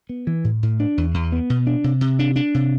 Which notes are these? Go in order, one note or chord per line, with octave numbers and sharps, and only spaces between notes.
B3
E3
A2
A2
D4
E2
E2
B3
B2
D4
C3
C3
D4
D4
C3